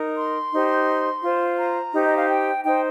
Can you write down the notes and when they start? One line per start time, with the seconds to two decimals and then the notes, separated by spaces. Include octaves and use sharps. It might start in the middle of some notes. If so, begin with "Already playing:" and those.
Already playing: D#4 A#4
0.17 C6
0.53 D#4 G4 C5
1.23 F4 C5
1.58 A#5
1.94 D#4 G4 C5
2.03 D#5
2.17 F5
2.29 G5
2.64 D#4 C5 G5